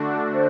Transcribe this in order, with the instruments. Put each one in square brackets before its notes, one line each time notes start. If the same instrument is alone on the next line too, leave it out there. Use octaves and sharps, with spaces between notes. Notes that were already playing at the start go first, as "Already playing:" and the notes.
Already playing: [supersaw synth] D3 A3 D4 F#4
[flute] C5